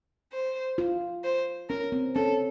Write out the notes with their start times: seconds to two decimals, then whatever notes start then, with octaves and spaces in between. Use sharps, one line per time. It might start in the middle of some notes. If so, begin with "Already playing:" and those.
0.33 C5
0.78 F4
1.24 C5
1.69 C#4 A#4
1.92 C4
2.15 C#4 A4